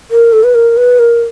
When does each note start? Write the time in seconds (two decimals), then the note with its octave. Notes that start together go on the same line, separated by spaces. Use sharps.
0.11 A#4
0.33 A4
0.44 B4
0.55 A#4
0.77 B4
0.99 A#4